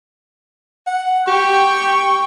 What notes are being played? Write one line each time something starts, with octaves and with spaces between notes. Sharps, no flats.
F#5
G4 G5 C#6